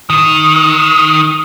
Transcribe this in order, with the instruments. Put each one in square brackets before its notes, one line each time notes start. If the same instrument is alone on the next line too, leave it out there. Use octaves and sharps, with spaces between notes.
[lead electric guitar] D#3